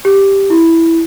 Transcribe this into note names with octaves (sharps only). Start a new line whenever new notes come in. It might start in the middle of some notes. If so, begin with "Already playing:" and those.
G4
E4